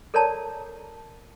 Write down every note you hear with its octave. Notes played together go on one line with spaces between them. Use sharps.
A4 A#4 C#5 D5 A5 A#5